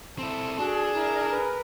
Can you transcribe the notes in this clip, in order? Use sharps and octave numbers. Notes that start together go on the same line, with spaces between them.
C4 E4 A4
D4 F#4 G#4
E4 A#4
B4